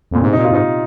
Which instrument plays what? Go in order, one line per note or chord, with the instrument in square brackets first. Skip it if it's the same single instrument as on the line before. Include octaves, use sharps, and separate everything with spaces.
[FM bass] F2 [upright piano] A#2
[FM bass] G#2 [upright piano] C3
[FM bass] A#2 [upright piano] D#4
[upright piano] F4
[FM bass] G#2 [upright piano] D#4